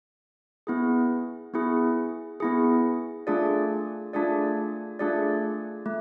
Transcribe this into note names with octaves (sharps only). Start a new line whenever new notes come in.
B3 E4 G#4
B3 E4 G#4
B3 E4 G#4
A3 D4 F4 G#4 D5
A3 D4 F4 G#4 D5
A3 D4 F4 G#4 D5
A3